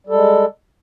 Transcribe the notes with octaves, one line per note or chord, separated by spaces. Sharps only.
G3 G#3 A4